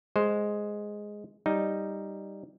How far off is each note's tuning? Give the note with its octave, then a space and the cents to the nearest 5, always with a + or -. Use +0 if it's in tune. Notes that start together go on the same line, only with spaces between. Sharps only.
G#3 +0 C5 +0
G3 +0 D#4 +0